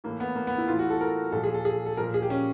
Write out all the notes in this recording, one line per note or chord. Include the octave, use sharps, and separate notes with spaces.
A2 E3 A#3
B3
A#3
B3
E4
A2 E3 F4
F#4
A4
A#4
A#2 F3 A4
G#4
A4
G#4
A4
A#2 F3 A#4
G#4
G4
C#4